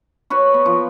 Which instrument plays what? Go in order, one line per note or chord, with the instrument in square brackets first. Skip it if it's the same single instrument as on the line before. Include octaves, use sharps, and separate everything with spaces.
[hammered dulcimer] F#4 B4 C#5
B3
F3